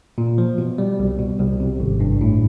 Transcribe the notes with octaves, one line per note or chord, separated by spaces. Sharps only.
A#2
F3
B2
G3
C2
B2
C2
C3
G#1
G2
A2